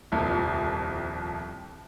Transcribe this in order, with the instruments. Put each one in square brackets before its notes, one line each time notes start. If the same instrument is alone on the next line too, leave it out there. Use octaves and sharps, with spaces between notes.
[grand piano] D#1 C2 F2